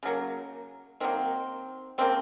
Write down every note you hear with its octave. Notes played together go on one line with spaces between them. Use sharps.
C#3 F#3 A#3
D#3 F#3 A#3 C4
C#3 F3 A#3 C4